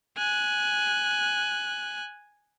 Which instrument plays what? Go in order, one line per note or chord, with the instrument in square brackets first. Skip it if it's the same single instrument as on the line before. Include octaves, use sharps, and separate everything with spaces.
[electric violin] G#5 F#6